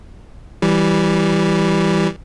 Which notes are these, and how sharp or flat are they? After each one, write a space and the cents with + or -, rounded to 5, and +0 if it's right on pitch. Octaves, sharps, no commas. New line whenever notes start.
E3 -5 G3 -5